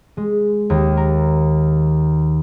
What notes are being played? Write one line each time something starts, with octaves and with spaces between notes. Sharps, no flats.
G#3
D#2
A#4